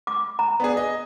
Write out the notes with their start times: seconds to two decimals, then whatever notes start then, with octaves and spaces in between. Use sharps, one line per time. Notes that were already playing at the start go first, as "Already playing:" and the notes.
0.07 D6
0.39 A#5
0.60 B3 D4 G#4
0.77 D#5